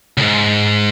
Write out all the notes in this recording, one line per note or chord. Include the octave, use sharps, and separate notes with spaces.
C#2 G#2